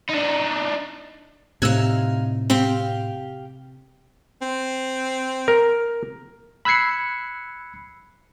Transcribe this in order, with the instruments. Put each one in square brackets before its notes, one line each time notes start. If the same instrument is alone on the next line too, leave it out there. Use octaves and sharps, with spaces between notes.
[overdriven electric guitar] D4 D#4
[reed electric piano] A2 [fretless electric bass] C3 [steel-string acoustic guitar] D#4 F5 [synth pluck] E6 F#6 G#6
[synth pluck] C4 [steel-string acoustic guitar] G4 F5
[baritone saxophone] C4
[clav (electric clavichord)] A#4
[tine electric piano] B5 E6 F#6 G#6 C7 C#7